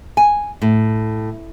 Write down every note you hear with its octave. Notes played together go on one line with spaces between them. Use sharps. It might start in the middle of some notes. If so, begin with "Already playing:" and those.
G#5
A2